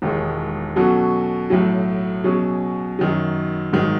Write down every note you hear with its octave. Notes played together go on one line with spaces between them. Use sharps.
E1 D#2 D#3 G#3
B2 F#3 C#4 F#4 A4
B1 A2 F#3
B2 F#3 C#4 G#4
F#2 D#3 F#3
G#1 G#2 D#3 F#3